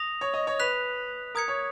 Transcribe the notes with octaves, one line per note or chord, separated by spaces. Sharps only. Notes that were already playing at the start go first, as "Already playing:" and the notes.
Already playing: D#6 A#6 F7
C#5
D#5
C#5
B4 F#6 B6 F7
A#4 D#6 G#6 C#7
C#5